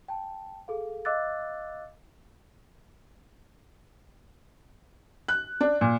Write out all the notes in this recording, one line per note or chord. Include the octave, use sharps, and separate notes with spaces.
G5 A5
G#4 A4 F5
D#5 F5 D6 E6 F#6 A6
F#6
D4
A#2